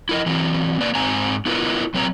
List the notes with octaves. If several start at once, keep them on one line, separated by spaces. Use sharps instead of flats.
E4 A#4 D#5
E3 F#3 C4
A#3 B4 D5
G#2 C4 G#5 A#5
B3 E4 F4 A#4 B4
F#3 C4 B4 C#5 G#5 A#5